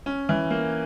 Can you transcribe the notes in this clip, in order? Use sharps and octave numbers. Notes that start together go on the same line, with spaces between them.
C#4
E3
A#3